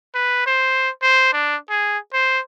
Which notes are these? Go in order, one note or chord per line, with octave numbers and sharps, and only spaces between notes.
B4
C5
C5
D4
G#4
C5